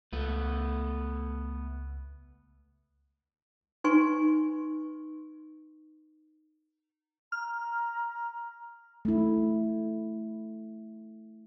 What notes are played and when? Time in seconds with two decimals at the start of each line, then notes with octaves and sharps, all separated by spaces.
0.13 C#2 A3 B3 B4
3.84 D#4 B4 G#5 C6 C#6
7.32 A#5 F6
9.05 A3 E4